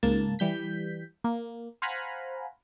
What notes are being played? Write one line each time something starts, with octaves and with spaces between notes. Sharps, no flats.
C#2 G#2 A#3 A5
E3 G3 G6 B6
A#3
C5 F5 F#5 G#5 A#5 B5